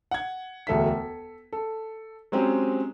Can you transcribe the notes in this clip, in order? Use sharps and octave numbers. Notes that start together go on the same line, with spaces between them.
F#5 G#6
E1 D2 A4 E5 B6
A4
A4
F#3 G#3 C4 C#4 G4 G#4